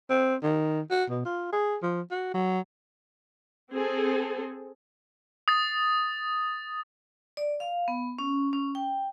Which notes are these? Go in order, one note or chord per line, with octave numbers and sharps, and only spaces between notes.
C4
D#3
F#4
B2
F4
G#4
F3
F#4
F#3
C4 G#4 A4
D#6 A6
D5
F5
B3
C#4
C#4
G5